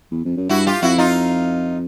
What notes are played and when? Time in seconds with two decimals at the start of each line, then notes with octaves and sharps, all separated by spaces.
0.11 E2
0.25 F2
0.37 F#2
0.49 G2 E4 F#4
0.67 F4 G4
0.82 F2 E4 F#4
0.98 D#4 F4